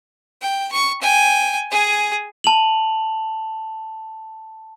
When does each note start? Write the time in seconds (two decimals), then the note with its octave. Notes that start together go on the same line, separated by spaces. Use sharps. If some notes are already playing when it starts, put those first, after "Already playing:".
0.42 G5
0.72 C#6
1.02 G5 G#5
1.71 G#4 G#5
2.44 A5 F7 F#7